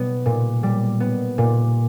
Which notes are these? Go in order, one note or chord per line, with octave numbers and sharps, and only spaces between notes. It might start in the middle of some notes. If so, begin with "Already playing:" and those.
Already playing: B2 G3 B3
A#2
G3
B3
A#2